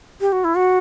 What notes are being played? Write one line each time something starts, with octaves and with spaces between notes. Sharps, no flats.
G4
F#4
E4
F#4